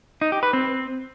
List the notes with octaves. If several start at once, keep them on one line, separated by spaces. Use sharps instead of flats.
D#4
G4
B4
C4